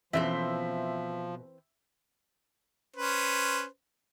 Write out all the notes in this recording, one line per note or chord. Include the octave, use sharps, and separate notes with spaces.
B2 E3 F3 C4 C#4 A4 C5 E5
C#4 B4 C5